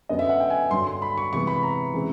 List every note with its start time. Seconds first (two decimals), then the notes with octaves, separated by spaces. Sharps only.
0.09 F#2 D3 F#3 B3 D#5
0.19 E5
0.29 F#5
0.40 G5
0.50 G#5
0.71 G2 D3 F#3 C6
0.87 C6
1.02 B5
1.18 C#6
1.32 C3 E3 G#3 B3 C#6
1.47 B5
1.63 A#5
1.94 C#3 E3 G#3 C4